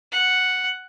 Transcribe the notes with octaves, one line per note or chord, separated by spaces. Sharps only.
F#5